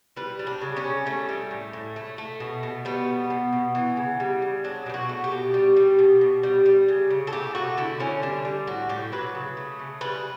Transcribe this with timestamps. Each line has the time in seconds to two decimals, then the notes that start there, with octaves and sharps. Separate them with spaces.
0.16 G3 B4
0.39 G3
0.47 D4
0.62 C#3
0.77 C#4
0.84 C#3
1.06 G3 A3
1.29 G3
1.51 A2
1.73 A2
1.96 A3
2.18 A3
2.40 B2
2.63 B2
2.85 G3 B3
3.08 G3
3.30 B2
3.53 B2
3.75 E3
3.97 C#3
4.20 G3
4.42 C#3
4.64 F#3 D4
4.86 B2 G4
4.94 F#4
5.09 A3
5.24 G4
5.32 B2
5.54 G3
5.77 G3
5.99 B2
6.21 B2
6.43 G3
6.66 G3
6.88 C#3
7.10 C#3
7.27 A4
7.33 A3 G4
7.55 A3 F#4
7.77 D3 E4
8.00 D3 C#4
8.22 G3 D4
8.45 G3
8.67 A2 F#4
8.89 A2 G4
9.12 F#3 B4
9.35 C#3
9.57 A3
9.79 C#3
10.01 G3 B4